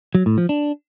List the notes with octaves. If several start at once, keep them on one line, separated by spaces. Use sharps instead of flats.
F#3
A2
F3
D4